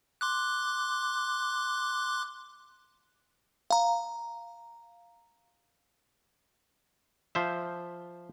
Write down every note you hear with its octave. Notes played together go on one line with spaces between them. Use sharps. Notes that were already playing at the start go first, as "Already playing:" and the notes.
C6 D6 F#6
F5 A#5
F3 C5 E5